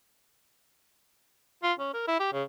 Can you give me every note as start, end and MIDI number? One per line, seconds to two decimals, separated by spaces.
1.63 1.73 65
1.79 1.92 61
1.94 2.06 70
2.08 2.18 64
2.20 2.32 67
2.33 2.43 49